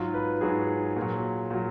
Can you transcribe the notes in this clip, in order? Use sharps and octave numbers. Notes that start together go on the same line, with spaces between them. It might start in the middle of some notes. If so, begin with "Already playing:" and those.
Already playing: G#2 F#3 F4
B4
G#2 F#3 G#4
A#2 F#3
A#2 F#3